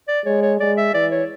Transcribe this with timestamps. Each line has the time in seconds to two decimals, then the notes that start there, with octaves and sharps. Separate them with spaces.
0.08 D5
0.25 G#3 C#5
0.42 C#5
0.60 G#3 D5
0.77 E5
0.94 E3 D5
1.12 C#5